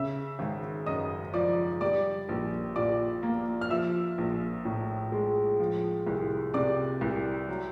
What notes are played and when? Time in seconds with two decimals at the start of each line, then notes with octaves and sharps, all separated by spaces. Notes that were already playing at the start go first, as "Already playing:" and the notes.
Already playing: C#3 E5 E6
0.39 G#1
0.86 F#2 D#5 D#6
1.33 F3 D5 D6
1.81 G3 D5 D6
2.29 A#1
2.76 A#2 D5 D6
3.23 A#3
3.61 F6
3.70 F3 E5 E6
4.18 A#1
4.65 A2
5.12 G#3
5.60 F3
6.07 C2
6.54 C3 D5 D6
7.01 C2
7.49 F#3